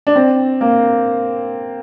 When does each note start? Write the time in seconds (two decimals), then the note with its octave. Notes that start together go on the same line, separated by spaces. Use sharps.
0.07 D4
0.16 C4
0.61 A#3